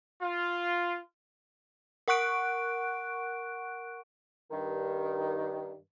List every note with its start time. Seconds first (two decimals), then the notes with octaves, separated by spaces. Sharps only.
0.20 F4
2.08 A#4 F#5 C#6 F#6 D7
4.51 G2 D#3